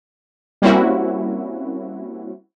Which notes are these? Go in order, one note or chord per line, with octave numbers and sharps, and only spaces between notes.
G3 A#3 C4 C#4 E4 F#4